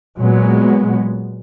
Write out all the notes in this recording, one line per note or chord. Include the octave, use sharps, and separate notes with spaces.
A#2 F#3 G#3 B3